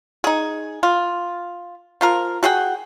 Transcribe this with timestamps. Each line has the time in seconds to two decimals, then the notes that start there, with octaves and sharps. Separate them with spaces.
0.24 D#4 G#4
0.83 F4
2.01 F3 F4 A#4
2.43 F#4 G#4 F#5 G5